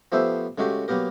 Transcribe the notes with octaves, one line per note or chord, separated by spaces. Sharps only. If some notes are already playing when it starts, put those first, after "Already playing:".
F3 A3 B3 G4 C5 E5
C#3 G#3 A3 F#4 G4
F#3 A#3 B3 G4 A#4